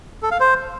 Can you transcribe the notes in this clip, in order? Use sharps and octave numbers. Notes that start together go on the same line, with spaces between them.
A4
F5
C5